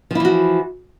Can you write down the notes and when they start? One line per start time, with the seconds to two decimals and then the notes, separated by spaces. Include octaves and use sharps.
0.11 F3
0.15 E4
0.20 E3
0.25 F#4